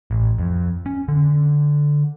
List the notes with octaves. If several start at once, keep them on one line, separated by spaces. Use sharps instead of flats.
A1
F2
C#4
D3